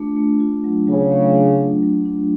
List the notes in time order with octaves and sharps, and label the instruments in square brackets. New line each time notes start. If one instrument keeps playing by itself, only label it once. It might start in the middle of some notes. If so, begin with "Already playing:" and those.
Already playing: [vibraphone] A3 D4 F4
A3
F4
F#3
[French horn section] C#3 [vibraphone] F#3
[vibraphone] A3
D4
F#3
F#3
D4